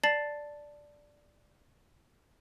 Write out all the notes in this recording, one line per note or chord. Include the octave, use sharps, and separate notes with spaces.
D5 A5 A6 C7 F#7